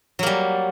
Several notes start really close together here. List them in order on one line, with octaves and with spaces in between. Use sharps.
F#3 A#3 G3